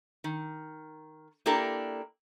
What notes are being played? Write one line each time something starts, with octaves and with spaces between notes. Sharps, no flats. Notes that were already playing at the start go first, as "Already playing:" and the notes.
D#3
A#3 D4 E4 G4 A4 A#4